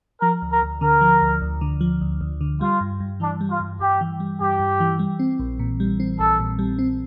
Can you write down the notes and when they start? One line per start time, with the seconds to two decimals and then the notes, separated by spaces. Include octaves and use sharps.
0.22 F3 A#4
0.42 D2
0.51 A#4
0.62 D2
0.81 D3 A#4
1.01 F3
1.22 D2
1.42 D2
1.61 D3
1.81 F3
2.01 D2
2.21 D2
2.41 D3
2.61 G3 F4
2.81 G2
3.00 G2
3.20 E3 D4
3.41 G3
3.50 F4
3.60 G2
3.80 G2 G4
4.01 E3
4.20 G3
4.40 G2 G4
4.60 G2
4.80 E3
4.99 G3
5.19 C4
5.40 A#1
5.59 A#2
5.80 G3
6.00 C4
6.19 A#1 A4
6.40 A#2
6.59 G3
6.79 C4